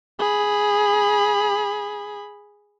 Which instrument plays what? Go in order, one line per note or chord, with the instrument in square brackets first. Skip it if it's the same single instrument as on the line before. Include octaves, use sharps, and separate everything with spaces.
[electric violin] G#4 B5